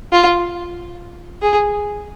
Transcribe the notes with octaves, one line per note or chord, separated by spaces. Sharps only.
F4
G#4